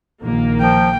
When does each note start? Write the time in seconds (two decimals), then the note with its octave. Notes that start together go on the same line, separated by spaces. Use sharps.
0.23 A#1 D#3 A#3
0.60 F3 G5